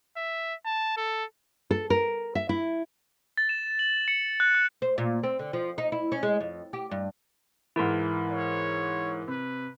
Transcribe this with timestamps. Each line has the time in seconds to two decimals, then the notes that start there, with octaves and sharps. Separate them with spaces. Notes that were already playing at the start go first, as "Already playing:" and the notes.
0.17 E5
0.66 A5
0.97 A4
1.71 A4
1.90 A#4
2.35 E5
2.49 E4
3.37 A6
3.49 E7
3.79 F#7
4.08 C#7
4.40 F#6
4.55 F#6
4.82 C5
4.98 A#2
5.23 C4
5.39 D3
5.53 F3
5.78 D#4
5.92 E4
6.12 C#4
6.23 G#3
6.40 F2
6.73 G4
6.91 G2
7.76 G#2 E3 E4 A#4 C6
8.31 C#5
9.28 C3 B4